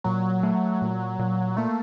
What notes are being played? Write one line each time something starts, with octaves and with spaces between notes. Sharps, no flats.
A#2 F#3
A3
A#2
A#2
A3 A#3